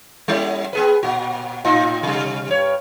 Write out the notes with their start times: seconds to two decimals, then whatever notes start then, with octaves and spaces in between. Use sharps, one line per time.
0.28 G3 C#4 E4
0.73 B3 G#4 B4
1.03 A#2 F#4
1.65 A2 D#4 F4
2.03 C3 G3
2.49 G2 C#5